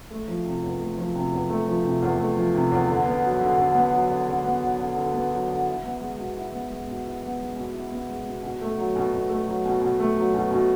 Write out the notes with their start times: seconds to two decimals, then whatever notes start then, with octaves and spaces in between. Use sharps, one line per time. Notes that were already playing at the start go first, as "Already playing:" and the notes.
0.11 A3
0.28 F3
0.45 C3
0.63 E2
0.80 A3
0.98 F3
1.15 C3
1.32 E2
1.50 A3
1.68 F3
1.84 C3
2.02 E2
2.19 A3
2.37 F3
2.54 C3
2.72 E2
2.88 D3
3.06 B3
3.23 F#3
3.41 D3
3.57 D3
3.75 B3
3.93 F#3
4.10 D3
4.28 D3
4.44 B3
4.62 F#3
4.79 D3
4.96 D3
5.14 B3
5.31 F#3
5.49 D3
5.67 E4
5.83 B3
6.01 G#3
6.17 B2
6.36 E4
6.52 B3
6.70 G#3
6.88 B2
7.04 E4
7.23 B3
7.39 G#3
7.56 B2
7.74 E4
7.92 B3
8.09 G#3
8.26 B2
8.43 B2
8.61 A3
8.77 F#3
8.96 B2
9.13 B2
9.29 A3
9.47 F#3
9.65 B2
9.82 B2
9.99 A3
10.17 F#3
10.34 B2
10.51 B2